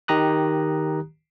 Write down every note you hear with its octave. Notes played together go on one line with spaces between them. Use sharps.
D#3 G4 A#5 D#6 F#6